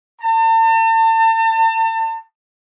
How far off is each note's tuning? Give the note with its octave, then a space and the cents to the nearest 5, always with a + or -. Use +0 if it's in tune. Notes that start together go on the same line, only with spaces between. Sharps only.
A5 +40